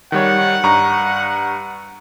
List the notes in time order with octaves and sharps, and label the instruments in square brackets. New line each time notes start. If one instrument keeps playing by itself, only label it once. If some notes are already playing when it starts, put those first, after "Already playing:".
[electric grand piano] D#3 G3 C#5 [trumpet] F#5
[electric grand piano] G2 A#5 C#6